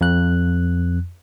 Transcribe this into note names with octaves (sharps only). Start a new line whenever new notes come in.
F2 F#6